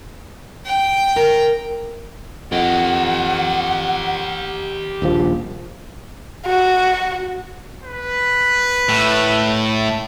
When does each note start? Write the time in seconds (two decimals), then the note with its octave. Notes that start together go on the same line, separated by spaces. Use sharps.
0.66 G5
1.16 A#4
2.52 F2 G4 D#5 F#5
5.02 D#1 A#1 F3
6.46 F#4
7.84 B4
8.89 A2